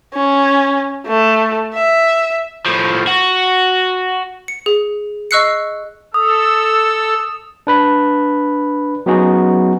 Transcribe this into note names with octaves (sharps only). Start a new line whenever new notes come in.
C#4
A3
E5
A2 F3
F#4
C#7
G#4
D#5 C#6 E6 F#6 C7 C#7
A4 D#6 E6
D4 B4 B5
F#3 B3 C#4 D#4 F#4 G#4